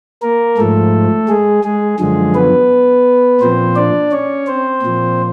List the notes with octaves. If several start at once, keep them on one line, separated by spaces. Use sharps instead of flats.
A#3 A#4
G#2 F3 A3 A4
G#3 G#4
G#3 G#4
F#2 D3 F3 G#3 G#4
B3 B4
A#2 F3 C4 C5
D4 D5
C#4 C#5
C4 C5
A#2 F3